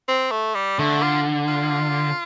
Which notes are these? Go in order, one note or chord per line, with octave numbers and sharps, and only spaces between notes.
C4
A3
G3
D3 A3
F4
F4